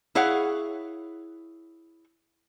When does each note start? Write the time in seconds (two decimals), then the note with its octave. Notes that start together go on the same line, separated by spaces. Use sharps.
0.15 E4 G#4 C#5 F5 F#5